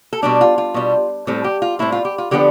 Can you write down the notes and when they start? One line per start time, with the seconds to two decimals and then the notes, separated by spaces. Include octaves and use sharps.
0.13 A4
0.22 B2 G3 D4 G4
0.41 F4
0.58 F4
0.74 B2 G3 D4
1.27 A2 G3 C4 A4
1.44 G4
1.62 F4
1.79 A2 G3 C4 E4
1.92 F4
2.05 G4
2.18 F4
2.31 D3 F3 B3 D4 G4